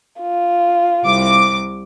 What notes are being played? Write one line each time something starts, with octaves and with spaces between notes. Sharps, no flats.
F4
C2 D6